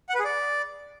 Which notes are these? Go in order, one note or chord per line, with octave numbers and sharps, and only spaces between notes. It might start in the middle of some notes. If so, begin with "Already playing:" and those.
F#5
B4
G#4
D5